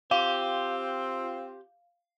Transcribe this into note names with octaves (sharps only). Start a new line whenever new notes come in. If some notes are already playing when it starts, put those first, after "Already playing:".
C4 F4 G4 F5